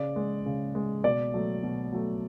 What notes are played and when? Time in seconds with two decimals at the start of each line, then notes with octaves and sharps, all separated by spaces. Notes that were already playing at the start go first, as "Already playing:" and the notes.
Already playing: C#3 D5
0.16 G#3
0.46 C#3
0.75 G#3
1.04 B2 D5
1.34 F#3 A3
1.63 B2
1.93 F#3 A3